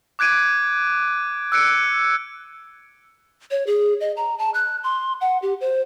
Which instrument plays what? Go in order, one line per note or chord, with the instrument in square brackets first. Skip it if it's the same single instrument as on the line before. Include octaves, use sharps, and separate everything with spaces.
[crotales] D6 F#6 G#6 D7 D#7
E6 F#6 C#7 D7
[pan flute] C#5
G#4
D#5
A#5
A5
F#6
C6
F#5
G4
C5